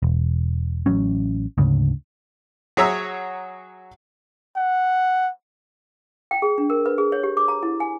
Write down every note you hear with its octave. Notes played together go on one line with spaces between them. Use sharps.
E1
A1 F#3 C#4
D2 G#2 C#3
F#3 G#4 C#5 E5 A#5 E6
F#5
G5
G#4
D4
A#4
B4
G#4
C#5
G4
D6
A#5
E4
G#5